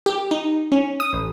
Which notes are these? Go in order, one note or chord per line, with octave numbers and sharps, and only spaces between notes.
G4
D#4
C#4
D#6
A1